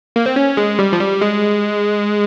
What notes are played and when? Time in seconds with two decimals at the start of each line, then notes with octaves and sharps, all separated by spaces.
0.16 A#3
0.26 C4
0.36 C#4
0.57 G#3
0.79 G3
0.93 F3
1.00 G3
1.21 G#3